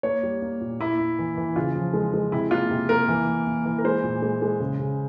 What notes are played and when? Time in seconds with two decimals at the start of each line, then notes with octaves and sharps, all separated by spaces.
0.03 A#3 C#5
0.23 G3
0.42 A#3
0.61 A#2
0.80 A#3 E4
0.99 A#3
1.19 E3
1.37 E3
1.56 C#3 F4
1.75 F3
1.93 G#3
2.14 G#3
2.32 C3 E4
2.51 A#3 F4
2.70 C3
2.89 A#3 A#4
3.08 E3
3.27 A#3
3.47 A#3
3.65 E3
3.78 A#4
3.84 G#3 C5
4.03 A#2
4.22 G#3
4.42 G#3
4.60 C#3
4.79 C#3